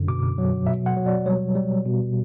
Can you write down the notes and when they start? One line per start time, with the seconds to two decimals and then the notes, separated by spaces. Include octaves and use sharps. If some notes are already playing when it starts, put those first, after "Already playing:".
Already playing: F#2 D3
0.08 B2 D6
0.38 F#3
0.67 B2 E5
0.86 F#5
0.97 F#3
1.06 D5
1.26 G3 C#5
1.55 G3
1.86 B2